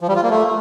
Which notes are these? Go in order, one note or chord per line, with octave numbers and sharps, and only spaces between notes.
F3
G3
F4
A#3
A3